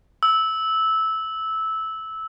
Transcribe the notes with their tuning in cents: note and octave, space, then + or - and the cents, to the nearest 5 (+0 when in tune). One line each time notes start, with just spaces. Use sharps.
E6 -15